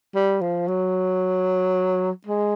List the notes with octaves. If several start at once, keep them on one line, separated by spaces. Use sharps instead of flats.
G3
F3
F#3
G#3